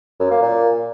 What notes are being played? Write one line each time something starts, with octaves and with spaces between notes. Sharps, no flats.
F#2
A#3
A#2